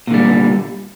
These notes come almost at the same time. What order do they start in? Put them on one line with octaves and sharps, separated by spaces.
A#2 D3 G3